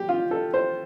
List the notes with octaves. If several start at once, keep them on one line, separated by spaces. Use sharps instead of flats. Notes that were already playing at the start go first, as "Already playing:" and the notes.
Already playing: G3 G4
F4
A4
C5